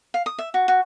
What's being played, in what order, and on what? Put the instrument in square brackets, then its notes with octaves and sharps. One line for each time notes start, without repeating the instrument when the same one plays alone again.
[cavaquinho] F5
D#6
E5
F#4
F#4